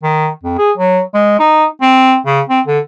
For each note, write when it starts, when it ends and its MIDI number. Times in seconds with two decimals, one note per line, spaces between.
0.03 0.29 51
0.43 0.56 41
0.58 0.71 68
0.77 1.00 54
1.14 1.37 56
1.39 1.65 63
1.82 2.17 60
2.26 2.41 49
2.49 2.60 60
2.67 2.79 50